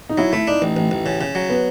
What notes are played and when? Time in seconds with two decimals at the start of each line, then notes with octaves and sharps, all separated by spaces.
0.10 D#4
0.18 F#3 E4
0.33 A3 E4
0.47 D4 D#4
0.62 A1
0.77 A1
0.91 A1
1.06 C#3
1.21 C#3
1.35 F#3
1.50 B3